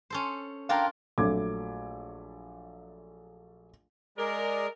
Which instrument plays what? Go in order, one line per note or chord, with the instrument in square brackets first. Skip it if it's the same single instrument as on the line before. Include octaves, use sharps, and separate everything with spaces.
[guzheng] C#4 A4 C5
[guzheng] D4 F4 A#4 [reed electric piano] F5 G5 A#5
[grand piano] A#1 F#3 A3 D6 G#6
[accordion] G#3 G#4 D5 [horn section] A#4